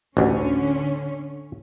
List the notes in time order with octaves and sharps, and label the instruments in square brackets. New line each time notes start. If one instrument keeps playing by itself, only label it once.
[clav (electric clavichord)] A1 D2 [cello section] D3 C#4